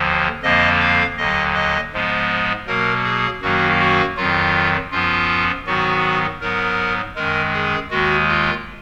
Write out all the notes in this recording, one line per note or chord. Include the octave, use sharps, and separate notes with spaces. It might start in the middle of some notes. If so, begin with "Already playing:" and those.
Already playing: D#2 D3 F3
F2 D3 F3 A#3 D#5
F5
D#2 D3 F#3 D#5
D#5
G#2 F3 G#3 B3
B2 F#3 A#3 A#4
G#4
F#2 D#3 F#3 A#3 F#4
F#4
F2 D#3 F#3 F4
F#2 F3 B3 F4
G#2 D#3 F#3 B3 F#4
G#2 F#3 B3 A#4
F#2 D#3 G#3 A#4
G#4
D#2 D#3 G#3 F#4
F4